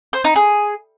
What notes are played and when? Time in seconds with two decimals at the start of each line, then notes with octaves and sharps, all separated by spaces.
0.13 C5
0.24 D#4
0.36 G#4